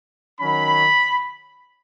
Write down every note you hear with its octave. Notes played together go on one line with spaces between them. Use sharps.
D#3 F#3 C#4 B5